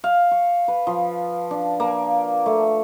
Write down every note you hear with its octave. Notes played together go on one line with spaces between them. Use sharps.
F5
C#6
B4
F3
D4
A#3
A3